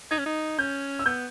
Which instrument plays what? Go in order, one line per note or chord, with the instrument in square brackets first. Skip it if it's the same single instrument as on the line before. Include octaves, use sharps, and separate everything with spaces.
[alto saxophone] D#4 [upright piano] G#6
[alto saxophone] C#4
D#4
[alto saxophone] C#4 [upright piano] G6
[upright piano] E6
[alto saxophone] B3 [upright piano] G6